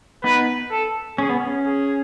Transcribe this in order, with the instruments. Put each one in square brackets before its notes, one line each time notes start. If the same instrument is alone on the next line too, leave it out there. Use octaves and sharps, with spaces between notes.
[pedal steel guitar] B3 D#4 [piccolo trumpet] B4
[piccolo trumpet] A4
[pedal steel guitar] C#4 [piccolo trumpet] G#4
[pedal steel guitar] B3
C#4
[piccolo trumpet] G#4